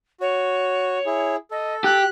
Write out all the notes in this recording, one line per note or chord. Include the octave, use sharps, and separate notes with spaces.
F#4 C#5
E4 G#4
A4 D#5
G4 F#6